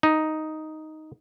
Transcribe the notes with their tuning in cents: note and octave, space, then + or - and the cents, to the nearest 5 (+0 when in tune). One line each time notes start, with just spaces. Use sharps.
D#4 +5